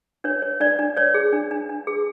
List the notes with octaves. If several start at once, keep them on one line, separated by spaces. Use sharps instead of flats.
D4 C#5
C#5
D4 D5
D4
C#5 D5
G#4
D4
D4
D4
G#4